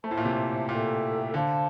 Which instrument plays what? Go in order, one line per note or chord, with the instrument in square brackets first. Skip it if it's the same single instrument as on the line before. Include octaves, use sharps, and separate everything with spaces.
[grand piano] A3 [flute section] C5 E5 A5
[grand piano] A2
A#2
C3
[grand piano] A#2 [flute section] A4 E5 G5
[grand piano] D3 [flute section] C5 F5 A5